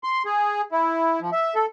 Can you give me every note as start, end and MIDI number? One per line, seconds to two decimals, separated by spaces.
0.04 0.22 84
0.26 0.61 68
0.72 1.20 64
1.21 1.30 53
1.32 1.54 76
1.55 1.66 69